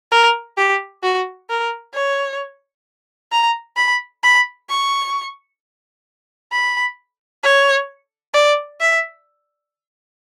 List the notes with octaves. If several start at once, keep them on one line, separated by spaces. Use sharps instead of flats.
A#4
G4
F#4
A#4
C#5
A#5
B5
B5
C#6
B5
C#5
D5
E5